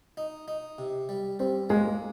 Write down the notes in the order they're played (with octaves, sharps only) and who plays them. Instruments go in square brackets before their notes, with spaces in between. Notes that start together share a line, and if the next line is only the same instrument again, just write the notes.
[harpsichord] D#4
D#4
C3
G3
[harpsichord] G3 [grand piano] C4
[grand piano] G#3 [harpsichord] A#3